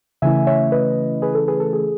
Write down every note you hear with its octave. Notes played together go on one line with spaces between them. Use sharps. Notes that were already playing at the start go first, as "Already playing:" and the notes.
C#3 E3 A3 C#4 E4 E5 G#5
C#5 E5
B4 D#5
G#4 B4
A4
G#4 B4
A4
G#4